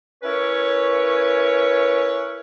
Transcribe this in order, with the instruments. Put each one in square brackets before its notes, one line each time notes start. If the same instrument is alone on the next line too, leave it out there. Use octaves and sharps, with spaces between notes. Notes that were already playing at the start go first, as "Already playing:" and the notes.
[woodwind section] C#4 E4 A#4 B4 C#5